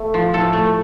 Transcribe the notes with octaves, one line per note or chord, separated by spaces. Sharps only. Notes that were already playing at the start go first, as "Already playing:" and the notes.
Already playing: A3
F3
A2 A4
A3